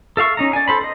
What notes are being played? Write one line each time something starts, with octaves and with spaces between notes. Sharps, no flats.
A4 E5 F5 C#6
C#4 D#4 A#5
D5 G#5
A4 C5 B5
C5 D#5